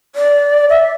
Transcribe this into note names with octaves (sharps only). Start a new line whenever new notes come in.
D5
E5